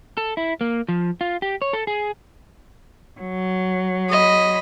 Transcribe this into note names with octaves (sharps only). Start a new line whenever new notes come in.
A4
E4
A#3
F3
F4
G4
C#5
A4
G#4
F#3
D#5 B5